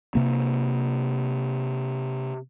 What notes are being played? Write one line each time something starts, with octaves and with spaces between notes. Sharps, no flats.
C3 A#3